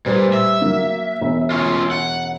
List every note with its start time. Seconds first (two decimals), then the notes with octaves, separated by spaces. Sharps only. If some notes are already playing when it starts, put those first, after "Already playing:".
0.06 A#2 G3 B4 C5
0.33 E5
0.62 F#3 A#3
1.21 E1
1.51 C#4 F4
1.91 F#5